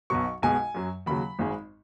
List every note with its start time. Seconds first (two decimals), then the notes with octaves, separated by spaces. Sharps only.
0.10 B1 B2 F#3 C#6
0.42 B1 B2 G#3 G#5
0.75 F#2 F#3
1.06 D#2 C#3 F#3 B5
1.39 G#1 G#2 G#3